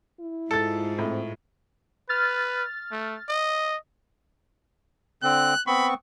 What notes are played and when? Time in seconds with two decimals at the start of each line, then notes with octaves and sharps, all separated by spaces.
0.20 E4
0.51 G#2 F4 A4 A6
0.98 A2 C4
2.09 B4 F6 A6
2.91 A3
3.29 D#5
5.23 D3 C4 F#6
5.67 B3 C4 B5 C#6